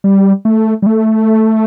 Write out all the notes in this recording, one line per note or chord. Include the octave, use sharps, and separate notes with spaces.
G3
A3
G3
A3